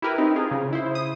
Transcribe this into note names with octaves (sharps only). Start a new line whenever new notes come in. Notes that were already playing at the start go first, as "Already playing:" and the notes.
E4 G4 A#4 B4
C4 D#4
F4 G#4
C#3
E4 C5
D#6